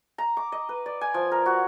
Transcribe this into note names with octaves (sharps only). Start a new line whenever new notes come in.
A#5
D6
D#5
B4
D5
G#5
F3
A#4
F#4